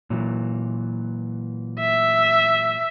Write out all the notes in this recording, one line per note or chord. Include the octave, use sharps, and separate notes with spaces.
A#2 E3 F#3
E5